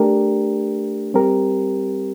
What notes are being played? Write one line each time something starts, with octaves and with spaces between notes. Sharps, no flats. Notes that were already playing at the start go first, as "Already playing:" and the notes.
Already playing: A3 D4 G4 A#4
G3 C4 G4 A#4